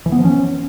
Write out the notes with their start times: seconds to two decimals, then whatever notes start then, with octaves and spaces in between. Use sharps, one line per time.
0.06 E3
0.12 B3
0.19 F3
0.25 C#4